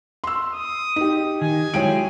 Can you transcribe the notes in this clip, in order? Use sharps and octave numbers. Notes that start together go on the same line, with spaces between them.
C6 E6
D#6
D#4 G4
D#3 G#5
F#3 G#3 E4 C#5 G5 D7